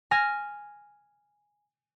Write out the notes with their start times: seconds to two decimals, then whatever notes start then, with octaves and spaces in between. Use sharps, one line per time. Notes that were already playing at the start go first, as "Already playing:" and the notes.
0.11 G#5 F6 A#6